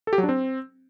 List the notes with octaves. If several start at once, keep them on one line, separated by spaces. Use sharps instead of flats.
A4
G4
F#3
D4
C4